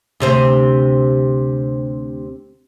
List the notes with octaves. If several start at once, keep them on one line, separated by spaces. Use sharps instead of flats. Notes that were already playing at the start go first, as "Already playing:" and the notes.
D2 C3 C4